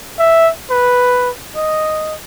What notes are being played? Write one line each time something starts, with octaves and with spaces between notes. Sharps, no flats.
E5
B4
D#5